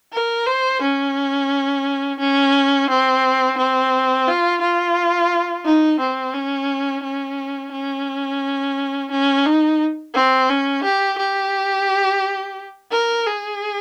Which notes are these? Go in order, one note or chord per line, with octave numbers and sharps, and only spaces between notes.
A#4
C5
C#4
C#4
C4
C4
F4
F4
D#4
C4
C#4
C#4
C#4
C#4
D#4
C4
C#4
G4
G4
A#4
G#4